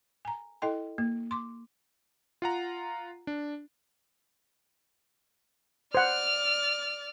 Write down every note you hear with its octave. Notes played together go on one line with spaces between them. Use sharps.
G#5 A#5
E4 A4 D#5 G5 C6
A#3
C6 D6
F4 F#5 A#5
D4
C5 D5 F#5 F6